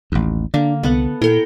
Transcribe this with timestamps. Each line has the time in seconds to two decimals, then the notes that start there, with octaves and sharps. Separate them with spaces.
0.12 A1 D#2
0.54 D3 A#3 D4
0.83 C2 B3 A4 F#5
1.22 A#2 E4 A4 A#4 G5